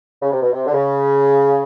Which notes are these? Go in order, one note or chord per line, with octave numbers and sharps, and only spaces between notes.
C#3
C3
B2
C3
D3
C#3